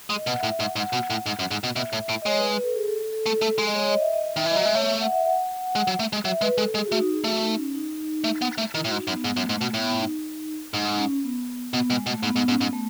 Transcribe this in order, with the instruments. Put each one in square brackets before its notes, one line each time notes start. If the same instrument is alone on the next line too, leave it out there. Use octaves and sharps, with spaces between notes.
[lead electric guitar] G#3 [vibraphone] D#5
[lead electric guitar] B2 [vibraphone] F#5
[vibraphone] E5
[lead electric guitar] A2
[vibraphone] E5
[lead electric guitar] G#2
[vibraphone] F#5
[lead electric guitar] G#2
B2
A2
G#2
F#2
G#2
B2
[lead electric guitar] B2 [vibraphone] E5
[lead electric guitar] A2
A2
[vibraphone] D#5
[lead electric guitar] G#3 [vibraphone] C#5
[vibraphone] B4
B4
A4
G#4
A4
A4
A4
[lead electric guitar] A3 [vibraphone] A4
[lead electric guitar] A3
G#3
[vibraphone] D#5
C#5
D#5
E5
D#5
E5
[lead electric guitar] D#3 [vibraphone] E5
[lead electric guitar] E3 [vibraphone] D#5
[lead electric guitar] F#3
[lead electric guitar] G#3 [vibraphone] E5
[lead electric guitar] A3 [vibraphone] C#5
[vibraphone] E5
F#5
E5
F#5
[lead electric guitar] G#3
F#3
A3
G#3
[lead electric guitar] F#3 [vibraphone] E5
[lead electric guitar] G#3 [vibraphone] B4
[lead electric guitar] G#3 [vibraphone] A4
[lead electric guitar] G#3 [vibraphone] G#4
[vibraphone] F#4
[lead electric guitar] A3
[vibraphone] D#4
G#4
[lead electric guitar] A3 [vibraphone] F#4
[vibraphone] D#4
C#4
D#4
[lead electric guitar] A3
B3
A3
[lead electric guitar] D#3 [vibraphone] E4
[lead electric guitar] A2 [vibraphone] F#4
[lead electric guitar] G#2
[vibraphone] D#4
[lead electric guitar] F#2
[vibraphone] B3
[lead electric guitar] G#2 [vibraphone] B3
[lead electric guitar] F#2
[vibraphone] A3
[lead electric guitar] G#2
[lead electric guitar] B2 [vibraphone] A3
[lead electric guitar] A2 [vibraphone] B3
[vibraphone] D#4
[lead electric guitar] G#2 [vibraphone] D#4
[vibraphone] C#4
B3
[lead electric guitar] B2 [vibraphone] B3
[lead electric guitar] B2 [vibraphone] G#3
[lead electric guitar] B2 [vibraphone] A3
[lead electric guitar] G#2 [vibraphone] B3
[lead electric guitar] G#2 [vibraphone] B3
[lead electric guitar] G#2 [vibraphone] C#4
[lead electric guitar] G#2 [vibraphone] B3
[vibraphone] A3